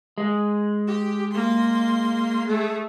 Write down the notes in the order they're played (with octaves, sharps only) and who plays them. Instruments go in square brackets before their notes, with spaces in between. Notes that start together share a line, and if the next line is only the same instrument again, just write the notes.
[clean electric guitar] G#3
[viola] G4
A#3 C6
A3 G#4